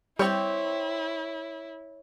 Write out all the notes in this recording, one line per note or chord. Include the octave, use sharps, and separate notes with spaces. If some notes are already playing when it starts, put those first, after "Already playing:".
G3 C4 E4 G4 C#5